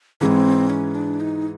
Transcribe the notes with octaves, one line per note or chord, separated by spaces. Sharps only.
G#2 E3 G#3 C4 C#4
C#4
D4
D#4